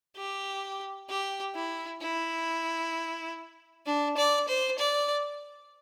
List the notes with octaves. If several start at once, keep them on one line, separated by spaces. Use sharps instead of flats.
G4
G4
E4
E4
D4
D5
C5
D5